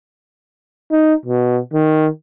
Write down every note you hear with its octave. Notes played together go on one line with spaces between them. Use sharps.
D#4
B2
D#3